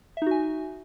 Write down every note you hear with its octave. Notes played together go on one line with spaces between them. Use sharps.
D#4 F#4 E5 G#5